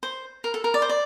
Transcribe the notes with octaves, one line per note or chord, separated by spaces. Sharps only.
C5
A#4
A4
A#4
D5
C5
D5